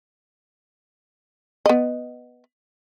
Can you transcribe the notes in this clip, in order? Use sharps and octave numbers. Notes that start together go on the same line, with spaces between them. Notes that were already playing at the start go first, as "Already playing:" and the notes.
B3 D#5